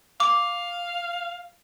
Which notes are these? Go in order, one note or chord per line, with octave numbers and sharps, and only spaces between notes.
F5 D6